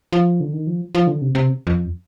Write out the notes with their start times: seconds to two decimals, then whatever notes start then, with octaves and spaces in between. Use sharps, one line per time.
0.13 F3
0.40 D3
0.53 D#3
0.67 F3
0.95 F3
1.07 D3
1.22 C3
1.35 C3
1.67 F2